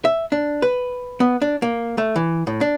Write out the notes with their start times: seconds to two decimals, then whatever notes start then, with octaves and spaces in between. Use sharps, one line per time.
0.05 E5
0.32 D4
0.62 B4
1.20 B3
1.42 D4
1.62 A#3
1.98 A3
2.16 E3
2.47 A2
2.61 D4